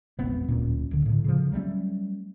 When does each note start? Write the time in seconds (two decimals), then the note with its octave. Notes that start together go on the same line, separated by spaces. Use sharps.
0.19 E1 A#1 B3 C4
0.48 D1 A#2 C#4
0.91 D1 D3
1.06 A2 D3
1.24 C#3 F3
1.52 F#3 G3 A3 C#4